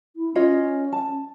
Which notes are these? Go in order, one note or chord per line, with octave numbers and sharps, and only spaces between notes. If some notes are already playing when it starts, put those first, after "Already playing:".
E4
C#4 F4 C#5 D#5
A5